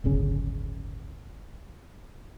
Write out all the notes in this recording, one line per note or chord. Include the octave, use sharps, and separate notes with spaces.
D1 G1 C#3 C#4